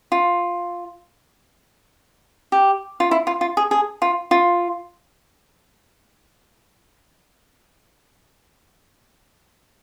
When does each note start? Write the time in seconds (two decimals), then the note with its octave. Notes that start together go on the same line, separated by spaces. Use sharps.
0.12 F4
2.52 G4
3.00 F4
3.11 E4
3.27 F4
3.41 F4
3.57 G#4
3.71 G#4
4.02 F4
4.31 F4